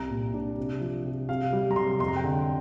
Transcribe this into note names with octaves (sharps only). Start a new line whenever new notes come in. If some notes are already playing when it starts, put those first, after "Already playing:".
Already playing: C2 A#5
A#2
D4
C3
F3
C3
C3 F5
G3
A#5
C3 C6
F2 C6
A#5
G5
D3 A#5